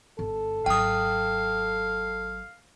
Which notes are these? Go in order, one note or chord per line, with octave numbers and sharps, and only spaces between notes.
G1 A4
G#1 F#3 F5 G5 D#6